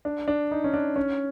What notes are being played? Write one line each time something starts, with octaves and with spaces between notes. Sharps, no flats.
D4
D4
D#4
C#4
D4
C#4